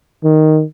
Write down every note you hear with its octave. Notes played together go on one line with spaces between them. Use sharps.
D#3